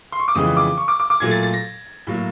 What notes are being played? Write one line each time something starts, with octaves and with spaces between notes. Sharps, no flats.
C6
C#6
D6
F2 C#3 E3 G#3 B3 D#6
D6
C#6
D6
D6
D6
A#2 F#3 A3 G#6
A6
A6
A#6
A2 F#3 A#3